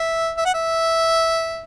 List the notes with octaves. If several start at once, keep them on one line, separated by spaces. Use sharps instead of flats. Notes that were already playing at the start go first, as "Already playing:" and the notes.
Already playing: E5
E5
F#5
E5